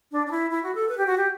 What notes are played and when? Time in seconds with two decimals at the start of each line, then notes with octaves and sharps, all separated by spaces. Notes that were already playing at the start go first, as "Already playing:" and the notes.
0.12 D4
0.26 D4
0.31 E4
0.50 E4
0.63 F#4
0.75 A4
0.89 B4
0.97 G4
1.07 F#4
1.17 G4